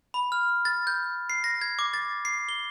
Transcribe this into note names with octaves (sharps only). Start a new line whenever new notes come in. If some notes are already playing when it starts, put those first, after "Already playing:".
B5
F6
A6
G6
C7
A#6
G#6
D6
A6
C7
G7